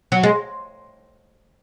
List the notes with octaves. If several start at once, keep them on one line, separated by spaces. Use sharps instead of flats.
F#3
G#3